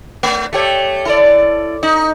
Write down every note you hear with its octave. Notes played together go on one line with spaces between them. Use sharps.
A3
A3 G4 C#5
E4 A4 D5
D#4